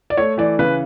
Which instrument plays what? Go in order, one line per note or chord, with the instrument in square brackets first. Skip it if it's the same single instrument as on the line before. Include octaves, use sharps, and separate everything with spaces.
[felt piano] D5
A3 C#5
E3 D5
C#3 B4